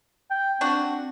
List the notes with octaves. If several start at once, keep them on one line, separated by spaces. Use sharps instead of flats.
G5
C4 D4 F#4